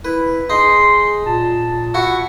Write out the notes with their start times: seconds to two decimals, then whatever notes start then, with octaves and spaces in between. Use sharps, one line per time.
0.05 E4 B4
0.50 D#4 G#4 C6
1.26 A#2 A5
1.94 E4 F#4 C#6